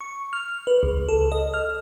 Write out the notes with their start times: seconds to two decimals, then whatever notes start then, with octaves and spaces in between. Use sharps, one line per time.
0.01 C#6
0.33 F6
0.67 B4
0.83 C#2
1.09 A4
1.32 D#5
1.54 F6